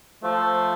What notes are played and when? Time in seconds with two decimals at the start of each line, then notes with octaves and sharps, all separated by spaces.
0.23 F3 A3